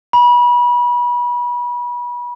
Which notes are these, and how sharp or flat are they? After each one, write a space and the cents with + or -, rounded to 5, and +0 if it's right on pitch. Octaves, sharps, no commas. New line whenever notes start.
B5 -30